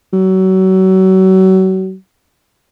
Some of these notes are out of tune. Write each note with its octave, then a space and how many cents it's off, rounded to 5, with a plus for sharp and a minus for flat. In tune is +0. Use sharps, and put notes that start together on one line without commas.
F#3 +30